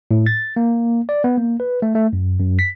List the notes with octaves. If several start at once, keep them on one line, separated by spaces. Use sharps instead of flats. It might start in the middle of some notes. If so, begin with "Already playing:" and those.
A2
A6
A#3
D5
B3
A#3
B4
A3
A3
F#2
F#2
B6